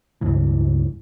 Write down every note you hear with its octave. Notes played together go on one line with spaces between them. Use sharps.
C#2 G2 E3